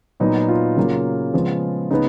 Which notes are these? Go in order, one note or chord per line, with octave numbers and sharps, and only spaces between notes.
A#2 F#3 B3 D#4
F4
C#3 F#3 A#3
C#3 F3 G#3 B3
C#3 G#3 B3 D#4